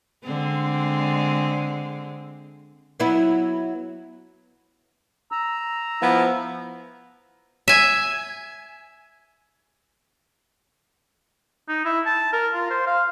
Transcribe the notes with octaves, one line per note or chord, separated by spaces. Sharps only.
D3 G#3 C4
F#3 B3 E4
A#5 E6
F3 B3 E4
E5 G#5
D#4
E4
A5
A#4
F4
C5
F5